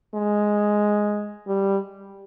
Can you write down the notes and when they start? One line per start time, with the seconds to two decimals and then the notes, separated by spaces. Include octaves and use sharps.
0.15 G#3
1.48 G3